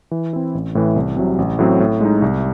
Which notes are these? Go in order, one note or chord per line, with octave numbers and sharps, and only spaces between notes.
E3
C4 E4
A1
A2 E3
C2
C3 F#3
A1
A2 F#3 C4
A2
G#3 D#4
C2